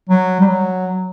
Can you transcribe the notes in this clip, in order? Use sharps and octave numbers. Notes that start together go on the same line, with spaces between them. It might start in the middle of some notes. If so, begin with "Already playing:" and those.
F#3
G3
F#3